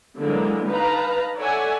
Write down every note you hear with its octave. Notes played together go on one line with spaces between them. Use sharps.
D3 E3 F#3 G#3 A#3
D#4 B4 F5 A5 A#5
A4 C#5 D5 E5 F#5 G#5